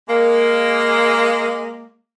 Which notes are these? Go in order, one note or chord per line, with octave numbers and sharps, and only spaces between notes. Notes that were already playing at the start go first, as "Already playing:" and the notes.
G#3 A#3